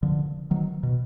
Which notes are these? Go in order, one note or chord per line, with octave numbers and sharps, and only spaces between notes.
D3 F3
D#3 F#3
B2